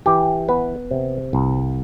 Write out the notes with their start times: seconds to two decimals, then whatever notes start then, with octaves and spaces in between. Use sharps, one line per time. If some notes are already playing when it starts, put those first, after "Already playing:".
0.06 E3 G4
0.49 B3 B4
0.91 C3
1.33 C2